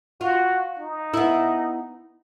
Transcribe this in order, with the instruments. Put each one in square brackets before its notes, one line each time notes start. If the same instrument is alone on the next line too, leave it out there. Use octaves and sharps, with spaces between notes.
[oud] F4 [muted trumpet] F#4
[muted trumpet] D#4
[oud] B3 E4